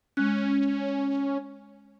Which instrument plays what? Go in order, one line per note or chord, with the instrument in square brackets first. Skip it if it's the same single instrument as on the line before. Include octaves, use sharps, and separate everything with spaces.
[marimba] G#3 F#6 [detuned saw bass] C#4